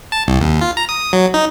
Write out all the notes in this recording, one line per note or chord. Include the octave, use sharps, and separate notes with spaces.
A5
C2
D#2
F4
A#5
D#6
F#3
D#4